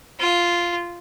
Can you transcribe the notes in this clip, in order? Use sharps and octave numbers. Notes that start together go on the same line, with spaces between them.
F4